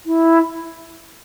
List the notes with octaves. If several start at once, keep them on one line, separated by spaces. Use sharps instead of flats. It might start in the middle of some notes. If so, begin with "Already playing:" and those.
E4